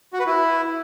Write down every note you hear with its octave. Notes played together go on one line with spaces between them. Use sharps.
F#4
B4
E4